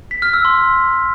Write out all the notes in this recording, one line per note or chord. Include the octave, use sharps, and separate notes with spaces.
B6
F6
E6
C6